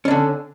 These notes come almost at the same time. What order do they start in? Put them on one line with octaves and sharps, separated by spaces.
C#4 D4 D3